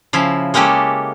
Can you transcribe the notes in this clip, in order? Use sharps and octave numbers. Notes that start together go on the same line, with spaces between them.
C#3 F3 E4
G#3 A#3 C#4 G4 A4